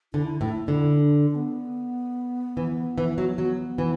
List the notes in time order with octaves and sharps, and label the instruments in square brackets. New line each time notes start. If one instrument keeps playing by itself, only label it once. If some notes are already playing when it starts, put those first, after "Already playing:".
[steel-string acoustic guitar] D3 [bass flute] E4
[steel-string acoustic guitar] A2 [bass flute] E4
[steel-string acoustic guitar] D3 [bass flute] E4
[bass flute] D4
B3
[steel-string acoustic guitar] E3
E3
F#3
[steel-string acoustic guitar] F#3 [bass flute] B3
[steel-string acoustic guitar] E3